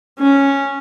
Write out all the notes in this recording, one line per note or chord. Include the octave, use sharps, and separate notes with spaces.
C#4